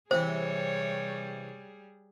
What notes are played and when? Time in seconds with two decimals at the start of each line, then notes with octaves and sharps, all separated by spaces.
0.11 C3 E3 G3 G#4 C5 C#5